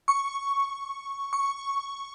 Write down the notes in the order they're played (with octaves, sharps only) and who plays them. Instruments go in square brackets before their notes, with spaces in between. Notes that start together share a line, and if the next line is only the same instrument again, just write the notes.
[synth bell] C#6
C#6